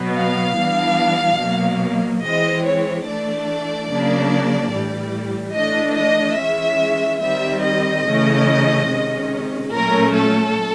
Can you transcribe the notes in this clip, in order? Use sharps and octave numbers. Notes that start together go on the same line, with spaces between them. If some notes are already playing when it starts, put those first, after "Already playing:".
Already playing: B2 F#3 B3
F5
E3 G3 B3 D4
B2 F#3 A#3
E3 G#3 C4 D#5
C#5
E3 A3 D4 D5
C#3 F#3 A#3 D4
A2 E3 G3
E3 A3 D4 D#5
D#5
E3 G#3 C#4 E5
D#3 G3 C4 E5
D#5
C#3 E3 A3 C#4
C3 D#3 G#3 C#4
A#2 F#3 A3 C#4 A#4
A4